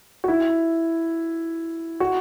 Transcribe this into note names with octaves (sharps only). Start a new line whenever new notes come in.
F#4
E4
F#4